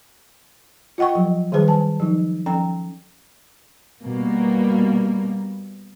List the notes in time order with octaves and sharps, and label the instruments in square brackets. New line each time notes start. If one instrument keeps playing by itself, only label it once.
[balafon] F4 D#5 F#5 G5 C#6
F3 F#3
D#3 G3 G#4 B4 C5
G#5 A5
F3 F#3 D#4
F3 C#4 A4 G5 A#5
[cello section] B2 G3 A#3